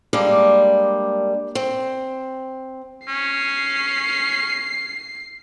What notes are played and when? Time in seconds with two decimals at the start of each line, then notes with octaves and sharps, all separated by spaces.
0.13 G3 G#3 A#3 D4
1.55 C4
3.08 C#4 C7